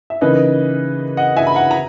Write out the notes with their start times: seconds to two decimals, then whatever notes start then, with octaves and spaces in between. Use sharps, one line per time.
0.10 E5
0.21 C#3 E3 A#3 D#4 B4 D#5
1.17 D#5 F#5
1.37 E5 G#5
1.47 B5
1.56 F#5 A#5
1.71 A#5